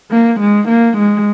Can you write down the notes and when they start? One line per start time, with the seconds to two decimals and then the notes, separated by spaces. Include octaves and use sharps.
0.11 A#3
0.40 G#3
0.69 A#3
0.98 G#3